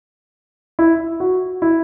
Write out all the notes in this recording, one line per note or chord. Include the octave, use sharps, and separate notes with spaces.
E4
F#4
E4